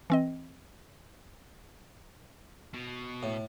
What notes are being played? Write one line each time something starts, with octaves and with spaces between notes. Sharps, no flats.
E3 C4 D#5
B2
A2